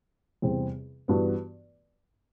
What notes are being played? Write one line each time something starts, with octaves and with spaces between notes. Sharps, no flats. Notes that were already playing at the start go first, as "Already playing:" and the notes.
E2 C3 G3 C4
G2 E3 B3 F#4